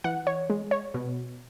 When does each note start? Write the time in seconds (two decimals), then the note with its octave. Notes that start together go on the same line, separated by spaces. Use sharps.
0.04 E3 F#5
0.27 C#5
0.50 G#3
0.71 C#5
0.94 B2